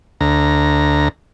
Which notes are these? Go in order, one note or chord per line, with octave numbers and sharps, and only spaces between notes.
D2 A#5